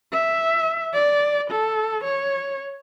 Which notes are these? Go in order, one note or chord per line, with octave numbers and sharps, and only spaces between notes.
E5
D5
A4
C#5